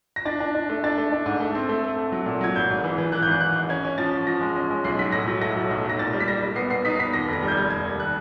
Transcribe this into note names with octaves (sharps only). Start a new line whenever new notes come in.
A#6
D4 A6
D4
D4
A3
D4 A6
A3
D4
G#2
A3
C4
A3
A3
A3
F#3
A#2
F#3 G#6
G#1 G6
G#2
E3
E3
E3 F#6
G6
G#1 F#6
G#1 F#6
G#2
C#4 G#6
C#4
F3 A6
F3
F3 A#6
G#3
C#4
G#3
B1 C7
F#3 B6
A2 A#6
F#3
A3 A#6
F#3
B1
B1 A#6
A#2 A6
G3
B6
G3 A#6
G3
B3 C7
B3 C7
D#4 B6
C7
B3 B6
D#2 A#6
F1
A#6
G3
G6
G#6
G3
F1 G#6
D#2
F#6